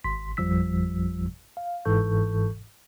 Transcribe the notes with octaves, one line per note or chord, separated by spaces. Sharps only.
G#1 C6 B6
G#1 F2 F3 G3 E6 B6
F5
G1 G#2 E3 A4 C#6 G6